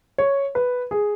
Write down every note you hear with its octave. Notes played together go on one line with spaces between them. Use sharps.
C#5
B4
G#4